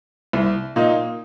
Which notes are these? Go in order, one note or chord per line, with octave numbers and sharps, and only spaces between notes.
C2
A#2 A#3 D#4